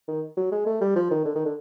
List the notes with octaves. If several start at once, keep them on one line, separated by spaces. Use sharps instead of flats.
D#3
F#3
G#3
A3
G3
F3
D#3
D3
D#3
D3